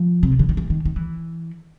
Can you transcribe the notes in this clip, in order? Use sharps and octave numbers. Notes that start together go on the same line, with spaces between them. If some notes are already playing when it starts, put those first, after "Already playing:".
Already playing: F3
C3
C#3
D3
D#3
E3
D#3
D#3
E3